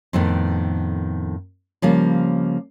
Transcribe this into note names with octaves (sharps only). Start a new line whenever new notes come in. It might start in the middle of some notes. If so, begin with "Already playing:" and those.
F2 A2 D#3 B3
C#3 F3 G3 A#3